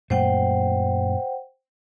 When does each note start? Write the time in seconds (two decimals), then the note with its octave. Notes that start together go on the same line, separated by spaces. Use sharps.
0.10 F#2 A#2 A3 C5 F#5 G5